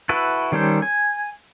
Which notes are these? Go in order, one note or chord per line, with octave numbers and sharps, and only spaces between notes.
E4 F#4 A4 B4
D#3 G3 C#4 A4 C5
G#5